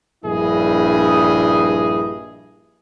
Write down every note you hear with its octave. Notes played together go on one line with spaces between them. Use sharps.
A#1 G2 E4 G#4 D#5